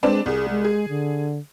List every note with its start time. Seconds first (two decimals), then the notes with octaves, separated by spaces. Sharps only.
0.03 G#3 C4 D4 B4
0.26 C2 G#4
0.50 G#3
0.65 G#4
0.89 D3